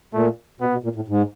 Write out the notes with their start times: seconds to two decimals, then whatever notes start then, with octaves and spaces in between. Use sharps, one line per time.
0.14 A#2 A3
0.60 B2 B3
0.72 B2
0.84 A#2
0.96 A2
1.08 G#2